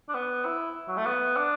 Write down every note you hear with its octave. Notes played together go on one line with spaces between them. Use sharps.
D4
B3
E4
F#3
A3
B3
D4